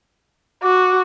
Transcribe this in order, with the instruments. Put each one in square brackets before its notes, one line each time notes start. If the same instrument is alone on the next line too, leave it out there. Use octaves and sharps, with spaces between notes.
[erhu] F#4 [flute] D6